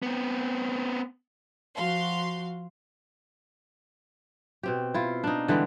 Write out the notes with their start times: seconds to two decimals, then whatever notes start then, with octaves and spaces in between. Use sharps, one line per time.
0.03 B3 C4
1.76 F3 F#4 F5 C6
4.63 B2 C4 G4
4.94 E4 F4
5.24 D4 D#4
5.48 D3 E3 G3 G#3